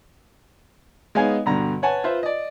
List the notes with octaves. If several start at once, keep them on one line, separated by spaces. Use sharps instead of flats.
G#3 B3 D#4 C#5 F5 G#5
G2 B2 D3 A#5
B4 C#5 F#5 G#5 A5
F4 B4 C5 E5
D5 D#5